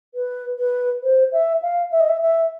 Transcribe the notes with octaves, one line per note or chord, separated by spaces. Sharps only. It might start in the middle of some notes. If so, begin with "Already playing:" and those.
B4
B4
C5
E5
F5
E5
D#5
E5
E5